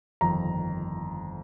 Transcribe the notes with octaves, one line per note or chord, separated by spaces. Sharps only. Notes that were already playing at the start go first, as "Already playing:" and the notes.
G1 F2 D#3 A#5